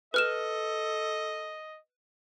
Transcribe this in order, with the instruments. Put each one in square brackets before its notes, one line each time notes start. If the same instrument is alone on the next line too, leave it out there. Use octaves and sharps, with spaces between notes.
[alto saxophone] A4 [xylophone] B4 F6 E7 [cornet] D#5